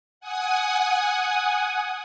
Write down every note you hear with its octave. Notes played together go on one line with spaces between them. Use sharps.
F#5 G#5 D#6